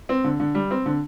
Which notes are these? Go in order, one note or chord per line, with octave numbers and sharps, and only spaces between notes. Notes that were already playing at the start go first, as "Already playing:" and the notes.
C4
D3
D3
G3
C4
D3